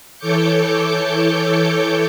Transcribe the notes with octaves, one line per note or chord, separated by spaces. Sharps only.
E3 A4 C#5 D6 G6 C#7